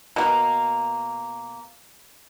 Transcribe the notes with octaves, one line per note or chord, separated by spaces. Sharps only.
B2 A#3